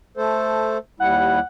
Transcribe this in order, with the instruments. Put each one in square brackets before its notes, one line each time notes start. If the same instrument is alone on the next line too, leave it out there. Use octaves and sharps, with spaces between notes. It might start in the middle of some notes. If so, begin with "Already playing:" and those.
[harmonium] A3 A4 C5
[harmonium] D#2 G3 E4 [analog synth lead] F#5